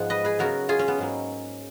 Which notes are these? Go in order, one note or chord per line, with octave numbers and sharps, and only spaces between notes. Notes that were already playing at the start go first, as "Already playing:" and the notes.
Already playing: G#2 F3 G#3 B3 F#5
B4 D#5
G#4 B4
C#3 F#3 B3 F#4 A#4
F4 G#4
C#4
B3
G#2 F#3 A#3